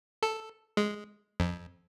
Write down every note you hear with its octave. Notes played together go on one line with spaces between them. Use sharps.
A4
G#3
F2